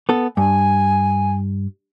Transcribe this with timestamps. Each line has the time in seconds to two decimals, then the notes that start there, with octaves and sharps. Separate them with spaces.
0.09 B3 A4
0.37 G2 G#5